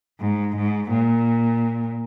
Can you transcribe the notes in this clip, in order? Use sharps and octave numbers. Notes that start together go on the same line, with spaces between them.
G#2
G#2
A#2